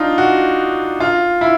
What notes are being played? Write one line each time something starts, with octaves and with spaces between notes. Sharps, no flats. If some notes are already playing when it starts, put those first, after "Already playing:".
Already playing: D4 D#4 F4
F#4
F4
E4